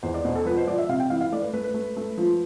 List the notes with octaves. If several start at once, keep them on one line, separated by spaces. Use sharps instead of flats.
E2 C5
D5
B2 C5
A4
F3 B4
C5
F3 D5
E5
C3 F5
G5
E3 F5
F5
A3 D5
B4
A3 B4
B4
A3
A3
F3